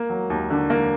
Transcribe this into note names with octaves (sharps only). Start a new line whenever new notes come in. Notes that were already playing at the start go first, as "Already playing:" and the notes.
Already playing: A#3
F#3
D#2
D3
A#3